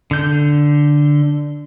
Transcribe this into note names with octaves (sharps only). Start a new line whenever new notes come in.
D3 G6